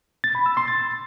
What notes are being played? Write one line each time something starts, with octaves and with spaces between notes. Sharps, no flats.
A6
B5
E6
C6
A6